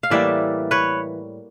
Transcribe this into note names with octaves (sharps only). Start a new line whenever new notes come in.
F5
A2 E3 G3 A#3 D5 E5
B4 C#5